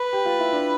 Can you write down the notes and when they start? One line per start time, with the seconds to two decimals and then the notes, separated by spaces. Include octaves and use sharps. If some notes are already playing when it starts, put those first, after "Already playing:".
Already playing: B4
0.13 G4
0.25 F4
0.39 E4
0.52 D4